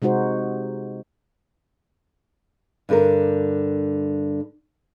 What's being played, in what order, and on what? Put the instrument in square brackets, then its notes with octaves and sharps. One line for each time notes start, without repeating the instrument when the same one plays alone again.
[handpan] C3 G#3 D#4 F#4 C5
[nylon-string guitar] G2 D3 A#4